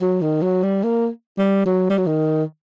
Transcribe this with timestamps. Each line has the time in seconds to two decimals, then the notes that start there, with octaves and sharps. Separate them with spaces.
0.01 F#3
0.22 D#3
0.42 F#3
0.63 G3
0.84 A#3
1.38 G3
1.65 F#3
1.90 G3
1.98 F#3
2.07 D#3